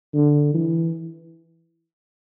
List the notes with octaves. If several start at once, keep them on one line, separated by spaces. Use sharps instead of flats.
D3
E3